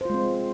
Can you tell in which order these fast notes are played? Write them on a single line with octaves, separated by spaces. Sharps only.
C5 F4 G#3 C4